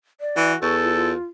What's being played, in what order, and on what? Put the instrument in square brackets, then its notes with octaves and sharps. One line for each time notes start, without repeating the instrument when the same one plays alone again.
[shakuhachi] D5
[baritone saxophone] E3 [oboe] F#4
[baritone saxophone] E2 [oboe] A4 [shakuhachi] C#6
[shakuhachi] F4
F4